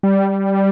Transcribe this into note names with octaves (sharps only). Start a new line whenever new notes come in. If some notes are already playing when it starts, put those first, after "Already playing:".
G3